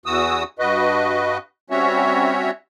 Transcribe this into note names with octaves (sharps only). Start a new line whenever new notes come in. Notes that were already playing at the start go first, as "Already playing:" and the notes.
E2 E3 F#4 D#6 E6
G2 F#4 B4 D#5
G3 C4 C#4 F#4 C#5 E5